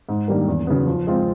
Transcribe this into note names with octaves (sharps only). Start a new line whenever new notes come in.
G#2
D#3 G3 A#3 D4
E2
C#3 F#3 B3
F3
G#3 C4 F4